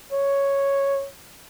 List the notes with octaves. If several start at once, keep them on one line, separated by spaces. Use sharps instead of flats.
C#5